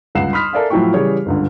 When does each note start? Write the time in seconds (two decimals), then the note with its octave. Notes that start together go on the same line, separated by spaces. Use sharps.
0.15 G1 C#2 F#5 C7 E7
0.33 B5 C6 D#6 F6 B6
0.53 A4 A#4 D5 E5 F5 G#5
0.70 A2 F3 F#3 E4 G5 C#6
0.94 C#3 E3 G3 G#4 C#5
1.26 G1 C#2 D3